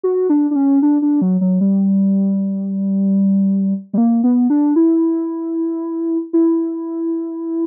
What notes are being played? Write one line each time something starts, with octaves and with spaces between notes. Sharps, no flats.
F#4
D4
D4
C#4
D4
D4
F#3
F#3
G3
G3
A#3
B3
D4
E4
E4